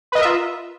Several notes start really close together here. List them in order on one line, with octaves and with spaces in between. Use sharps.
B4 D#5 A#4 E5 F4